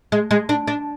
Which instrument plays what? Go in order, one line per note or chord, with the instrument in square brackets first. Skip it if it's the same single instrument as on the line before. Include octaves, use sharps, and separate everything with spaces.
[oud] G#3
G#3
D4
D4